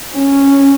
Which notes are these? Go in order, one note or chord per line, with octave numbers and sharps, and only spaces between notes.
C#4